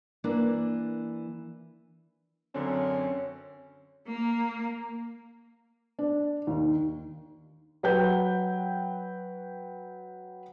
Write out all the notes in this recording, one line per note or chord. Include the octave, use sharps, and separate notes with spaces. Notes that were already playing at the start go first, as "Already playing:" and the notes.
E3 A#3 D4
F#2 D3 C4 C#4
A#3
D4
D#2
F#3 B4 G5 G6